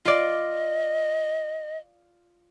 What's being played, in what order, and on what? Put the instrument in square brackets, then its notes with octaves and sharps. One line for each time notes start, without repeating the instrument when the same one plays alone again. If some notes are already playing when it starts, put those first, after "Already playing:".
[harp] F4 D5 [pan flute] D#5